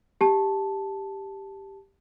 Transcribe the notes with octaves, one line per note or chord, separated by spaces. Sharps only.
G4 A5